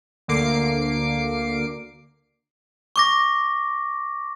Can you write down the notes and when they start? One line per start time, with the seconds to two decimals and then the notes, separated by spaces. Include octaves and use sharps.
0.28 D2 D3 A#3 D6 C7 D7
2.96 C#6 D6 A#6